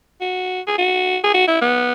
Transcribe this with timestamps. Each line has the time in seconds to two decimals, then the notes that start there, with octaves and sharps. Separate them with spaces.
0.21 F#4
0.67 G#4
0.78 F#4
1.24 G#4
1.34 F#4
1.48 E4
1.61 B3